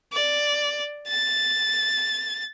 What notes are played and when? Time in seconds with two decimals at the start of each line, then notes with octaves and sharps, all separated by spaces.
0.13 D5
1.08 A6